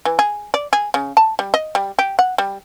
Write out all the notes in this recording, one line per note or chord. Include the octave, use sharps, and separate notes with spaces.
E3
G#4
D5
G#4
C#3
A5
G3
D#5
G3
G4
F#5
G3